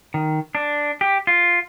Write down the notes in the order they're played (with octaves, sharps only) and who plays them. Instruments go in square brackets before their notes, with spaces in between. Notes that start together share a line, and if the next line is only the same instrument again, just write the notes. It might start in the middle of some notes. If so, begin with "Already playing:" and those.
[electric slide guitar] D#3
D4
G4
F4